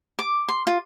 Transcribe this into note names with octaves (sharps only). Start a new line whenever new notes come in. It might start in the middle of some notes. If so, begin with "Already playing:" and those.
D6
C6
F4